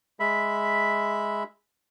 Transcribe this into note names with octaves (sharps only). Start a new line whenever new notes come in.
G#3 E5 B5